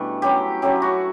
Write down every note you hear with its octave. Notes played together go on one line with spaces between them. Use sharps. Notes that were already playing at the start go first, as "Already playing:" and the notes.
Already playing: B2 E3 G3 A3 D4
F#3 C#4 E4 G4
F#3 A3 C#4 E4 G4
F#4